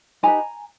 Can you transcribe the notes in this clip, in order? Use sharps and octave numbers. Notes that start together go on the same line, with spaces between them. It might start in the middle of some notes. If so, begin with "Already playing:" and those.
D#4 G4 B4 G#5 A#5